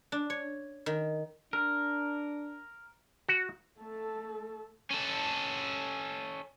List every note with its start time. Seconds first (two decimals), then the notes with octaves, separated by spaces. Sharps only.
0.12 D4
0.30 C#5
0.86 D#3
1.53 D4 A#4
3.29 F#4
3.79 A3 A4
4.91 C#4 A4